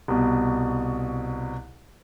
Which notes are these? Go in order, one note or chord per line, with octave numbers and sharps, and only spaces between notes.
C2 B2